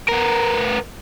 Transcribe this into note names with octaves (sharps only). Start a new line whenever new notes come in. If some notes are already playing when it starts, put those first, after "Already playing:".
B3 A#4